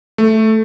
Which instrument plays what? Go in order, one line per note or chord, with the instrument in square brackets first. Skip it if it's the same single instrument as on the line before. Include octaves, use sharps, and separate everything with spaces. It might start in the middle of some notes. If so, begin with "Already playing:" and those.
[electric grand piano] A3